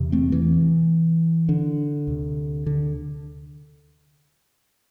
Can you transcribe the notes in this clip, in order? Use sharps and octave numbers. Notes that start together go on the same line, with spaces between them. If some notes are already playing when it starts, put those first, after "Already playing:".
Already playing: E2 C3
A3 C4
E3
D3
D2 C3
D3